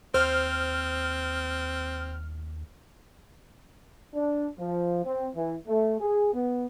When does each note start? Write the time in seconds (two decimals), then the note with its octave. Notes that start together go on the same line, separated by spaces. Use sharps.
0.14 D#2 C4 C5 F6
4.14 D4
4.58 F3
5.04 C4
5.36 E3
5.68 A3
6.00 G#4
6.34 B3